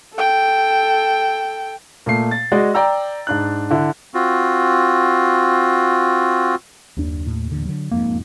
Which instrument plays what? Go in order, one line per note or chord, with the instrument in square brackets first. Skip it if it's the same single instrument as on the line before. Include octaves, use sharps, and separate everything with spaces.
[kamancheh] A4 G5
[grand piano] A#2 A3 C7
A6
G#3 F#4 D5 D#5
D5 G5 A#5 E6
G#2 D4 F#6
D3 E4
[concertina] C4 F4 F#4
[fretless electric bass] F#1 D4 [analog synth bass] D#2
[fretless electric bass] A2
D#1 A1 D3
D3 F#3
[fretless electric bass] E1 F2 G#2 [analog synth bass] A#3